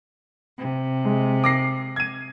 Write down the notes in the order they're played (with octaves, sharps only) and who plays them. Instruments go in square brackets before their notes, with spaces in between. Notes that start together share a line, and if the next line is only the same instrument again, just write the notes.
[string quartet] C3
[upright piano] G#3
D6 A#6 C7
G#6 D#7